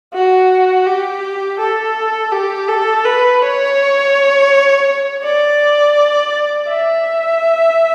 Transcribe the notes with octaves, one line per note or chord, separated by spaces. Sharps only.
F#4
G4
A4
G4
A4
B4
C#5
D5
E5